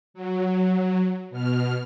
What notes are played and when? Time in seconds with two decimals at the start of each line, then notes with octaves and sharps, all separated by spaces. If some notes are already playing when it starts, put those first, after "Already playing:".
0.14 F#3
1.30 B2 F6